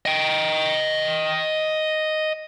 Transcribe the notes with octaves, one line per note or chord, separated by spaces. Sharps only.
D#5 G5